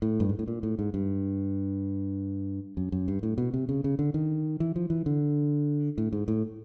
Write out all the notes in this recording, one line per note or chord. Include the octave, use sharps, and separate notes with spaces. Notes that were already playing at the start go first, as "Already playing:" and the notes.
A2
G2
G#2
A2
A#2
A2
G#2
G2
F#2
F#2
G2
A2
B2
C3
C#3
C#3
D3
D#3
E3
F3
E3
D3
A2
G#2
A2